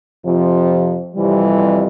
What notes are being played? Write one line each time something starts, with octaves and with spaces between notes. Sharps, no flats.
F2 C3 F3
F2 C3 E3 G3